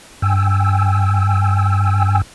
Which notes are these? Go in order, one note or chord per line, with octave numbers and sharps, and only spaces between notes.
G2 G5 G#5 E6